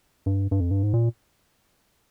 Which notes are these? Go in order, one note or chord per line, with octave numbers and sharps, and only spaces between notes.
G2
G2
F2
G2
G#2
A#2